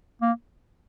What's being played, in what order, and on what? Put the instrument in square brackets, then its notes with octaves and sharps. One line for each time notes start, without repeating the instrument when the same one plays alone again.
[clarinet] A#3